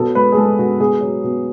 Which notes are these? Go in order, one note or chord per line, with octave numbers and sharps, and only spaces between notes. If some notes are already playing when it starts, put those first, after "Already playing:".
Already playing: B2 F#3 A4
G#3 B4
G#4
G#3 A4
B2 F#4
B2 G#4
F#3
B2